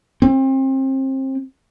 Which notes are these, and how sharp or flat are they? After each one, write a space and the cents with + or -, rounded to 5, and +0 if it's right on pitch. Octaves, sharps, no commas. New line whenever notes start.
C4 +30